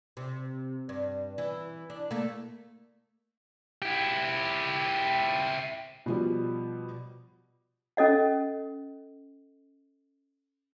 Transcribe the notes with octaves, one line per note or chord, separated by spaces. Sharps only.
C3
G2
E3
D4
A3 A#3
E4 G4
B2 F3 G3
C#4 A4 D#5 F#5